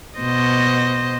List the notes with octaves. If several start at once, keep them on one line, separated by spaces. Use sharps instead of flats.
B2 C5 D#5